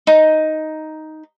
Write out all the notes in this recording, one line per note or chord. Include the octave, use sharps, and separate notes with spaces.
D#4